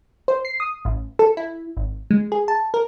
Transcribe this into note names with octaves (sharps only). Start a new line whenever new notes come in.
C5
C7
D#6
A1
A4
E4
G#1
G#3
G#4
A5
A#4